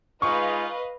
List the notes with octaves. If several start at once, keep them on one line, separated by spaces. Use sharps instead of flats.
G#3 D#4 F4 B4 D#5 F5 C#6